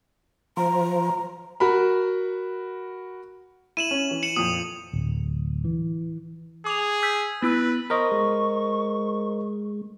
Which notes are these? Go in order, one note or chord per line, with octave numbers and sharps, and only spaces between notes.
F3 A#5
F#4 A#4 B5
E4 D#7 E7 F#7
C#4
E3
C#7 E7 F#7
F2 A#2 D#6
D1
E3
G#4 D6 F7
E6 G6 B6
B3 E4 B4 E6
A#4 C5 D#5 C#6
G#3